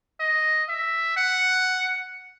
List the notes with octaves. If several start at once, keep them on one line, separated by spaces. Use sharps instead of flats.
D#5
E5
F#5